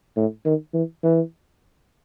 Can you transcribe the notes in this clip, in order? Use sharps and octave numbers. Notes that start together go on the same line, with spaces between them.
A2
D#3
E3
E3